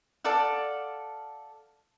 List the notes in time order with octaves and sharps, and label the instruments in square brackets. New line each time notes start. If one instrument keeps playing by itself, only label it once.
[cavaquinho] A4 D5 F5 F#5